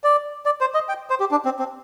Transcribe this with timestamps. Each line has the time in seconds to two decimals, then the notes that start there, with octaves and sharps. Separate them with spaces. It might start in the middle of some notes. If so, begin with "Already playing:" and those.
0.04 D5
0.46 D5
0.61 C5
0.74 D#5
0.89 G5
1.10 C5
1.20 G4
1.31 D4
1.45 C4
1.59 C4